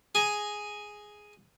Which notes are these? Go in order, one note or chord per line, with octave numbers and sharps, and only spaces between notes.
G#4 G#5 A#5